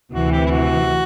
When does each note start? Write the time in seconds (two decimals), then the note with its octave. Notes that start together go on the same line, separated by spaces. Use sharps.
0.12 D2 C3 E3 F#4
0.32 G4
0.46 E4
0.50 F#4